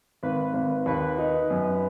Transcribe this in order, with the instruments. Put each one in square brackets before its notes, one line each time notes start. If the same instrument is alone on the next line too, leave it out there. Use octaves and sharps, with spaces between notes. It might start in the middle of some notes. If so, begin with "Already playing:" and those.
[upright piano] G#1 [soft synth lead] B4
[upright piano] G#1
[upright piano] D#2 [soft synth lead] B4
[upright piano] D#4
F#2